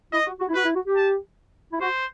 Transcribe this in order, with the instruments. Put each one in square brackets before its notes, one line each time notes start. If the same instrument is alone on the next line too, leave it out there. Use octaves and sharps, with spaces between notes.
[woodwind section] E4 [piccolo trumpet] D#5
[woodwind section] F#4
F#4
E4
[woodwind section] F#4 [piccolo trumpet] B4
[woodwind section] E4
F#4
G4
[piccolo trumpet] A5
[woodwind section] E4
[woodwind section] F#4 [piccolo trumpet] C5